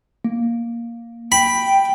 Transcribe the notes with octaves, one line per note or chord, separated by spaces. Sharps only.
A#3
G5 B5